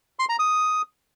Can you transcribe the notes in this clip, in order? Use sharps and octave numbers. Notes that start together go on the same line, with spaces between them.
C6
A#5
D#6